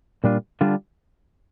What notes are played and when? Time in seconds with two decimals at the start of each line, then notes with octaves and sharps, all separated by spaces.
0.24 A#2 G3 D4 F4
0.61 D3 G3 D4 F4